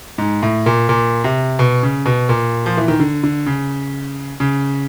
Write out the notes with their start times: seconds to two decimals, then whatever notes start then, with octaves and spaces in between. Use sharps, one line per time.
0.18 G#2
0.43 A2
0.66 A#2
0.89 A#2
1.24 C3
1.59 B2
1.83 C#3
2.06 B2
2.29 A#2
2.66 F3
2.77 E3
2.88 D#3
3.00 D3
3.24 D3
3.46 C#3
4.40 C#3